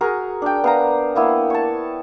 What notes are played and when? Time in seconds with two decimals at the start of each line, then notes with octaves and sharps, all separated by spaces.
0.01 F#4 G#4 A#4
0.42 D4 G5
0.64 B3 F5 A#5
1.15 A#3 B3 E4
1.50 C#5 A5